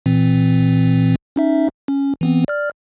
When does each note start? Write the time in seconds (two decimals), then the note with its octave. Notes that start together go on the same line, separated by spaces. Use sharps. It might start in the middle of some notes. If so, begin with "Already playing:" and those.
0.06 A#2 E3 C4
1.36 C#4 D#4 E5
1.88 C#4
2.21 E3 B3 C4
2.48 D5 F6